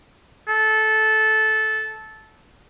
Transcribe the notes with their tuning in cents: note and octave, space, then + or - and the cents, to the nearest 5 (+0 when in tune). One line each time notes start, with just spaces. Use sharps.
A4 -15